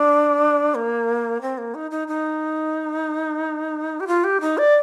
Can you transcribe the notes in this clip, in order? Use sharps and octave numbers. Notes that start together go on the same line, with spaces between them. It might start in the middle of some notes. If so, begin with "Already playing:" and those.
Already playing: D4
A#3
C4
A#3
D#4
D#4
D#4
G4
F4
G4
D#4
D5